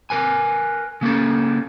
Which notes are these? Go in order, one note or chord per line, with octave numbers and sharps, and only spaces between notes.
A#4 B4 G#5
C#3 A#3 C#4 A4